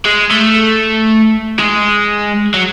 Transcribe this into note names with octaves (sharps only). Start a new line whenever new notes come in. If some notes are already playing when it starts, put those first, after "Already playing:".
G#3
A3
G#3
F#3